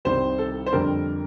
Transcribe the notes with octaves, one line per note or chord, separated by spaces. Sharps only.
C2 C3 D#3 G3 C5
A4
C5
F2 D3 G3 A#4